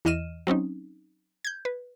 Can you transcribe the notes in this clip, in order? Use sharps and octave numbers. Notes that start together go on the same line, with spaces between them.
E2 E3 D#5 F6 D#7 E7
F#3 C4 C#4 D#4
G6 G#6
B4